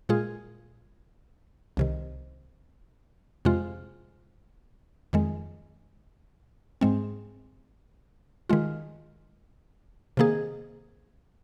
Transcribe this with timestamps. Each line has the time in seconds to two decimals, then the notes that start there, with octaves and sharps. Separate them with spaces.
0.09 A#2 G#3 F4 G#4
1.77 C2 C3 D#3
3.45 F2 C3 G#3 F4
5.13 F2 D#3 G#3
6.81 G#2 G#3 C4
8.49 D#3 G#3 F4
10.17 C3 D#3 A#3 G#4